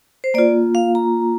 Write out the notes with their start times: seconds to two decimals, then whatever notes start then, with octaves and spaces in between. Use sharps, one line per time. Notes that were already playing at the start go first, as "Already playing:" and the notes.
0.24 C5
0.34 A#3 F4 D5
0.75 F5
0.95 A#5